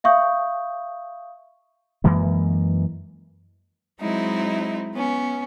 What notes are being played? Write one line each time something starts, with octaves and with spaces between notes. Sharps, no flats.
E5 F5 C#6 D#6 G6
F#2 E3 G#3 A#3
F#3 G#3 C4 D#4 E4
B3 C#4